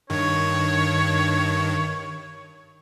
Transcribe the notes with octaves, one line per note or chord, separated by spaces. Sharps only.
G2 D#3 C#5